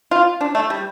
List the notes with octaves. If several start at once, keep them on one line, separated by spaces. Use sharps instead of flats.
F4
D4
A3
G3